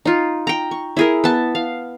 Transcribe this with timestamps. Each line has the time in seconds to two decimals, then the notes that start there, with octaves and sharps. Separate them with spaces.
0.05 D#4 F4
0.47 G5 A#5
0.71 C#6
0.97 E4 G#4 A#4
1.24 B3 A5
1.55 F5